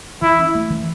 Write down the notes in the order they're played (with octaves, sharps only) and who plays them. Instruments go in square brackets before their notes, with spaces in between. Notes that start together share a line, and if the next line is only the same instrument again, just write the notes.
[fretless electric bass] E3 [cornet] E4
[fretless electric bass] C#4
A3
E3